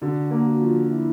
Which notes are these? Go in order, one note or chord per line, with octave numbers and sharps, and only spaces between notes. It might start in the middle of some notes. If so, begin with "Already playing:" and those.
D3 F#4
A#3
F#4
F3
E4